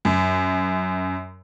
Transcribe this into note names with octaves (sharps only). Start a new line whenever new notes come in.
F#2